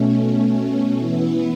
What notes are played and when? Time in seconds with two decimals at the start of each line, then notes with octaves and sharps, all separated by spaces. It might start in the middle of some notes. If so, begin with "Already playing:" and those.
Already playing: B2 A3 C#4
0.99 E3 B3 E4